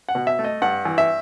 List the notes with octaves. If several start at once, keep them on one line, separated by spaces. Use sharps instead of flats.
F#5
B2
E5
A3
D#5
G2 F#5
E3
E5